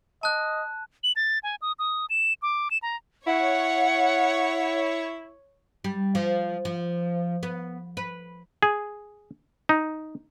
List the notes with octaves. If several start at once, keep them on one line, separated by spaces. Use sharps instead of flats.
D#5 A5 F#6
F#7
A6
G#5
D#6
D#6
E7
D6
E7
A#5
E4 C#5 F#5
G3
F3
F3
B3
B4
G#4
D#4